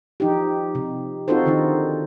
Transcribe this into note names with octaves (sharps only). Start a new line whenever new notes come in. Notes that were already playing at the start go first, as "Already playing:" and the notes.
F3 D#4 G4
C3
C4 D#4 F4 F#4 A4 C5
D3 D#3 D#4